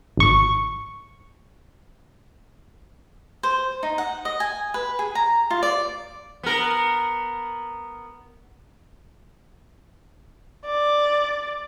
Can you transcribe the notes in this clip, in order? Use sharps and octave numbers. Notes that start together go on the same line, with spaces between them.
G#1 C#6
C5
D#4
F#5
D#5
G#5
B4
G#4
A#5
F4
D5
B3 A#4
D5